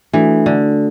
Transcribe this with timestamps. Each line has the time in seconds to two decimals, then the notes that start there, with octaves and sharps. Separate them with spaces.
0.13 E3 A3 D4 F#4 A4
0.46 D3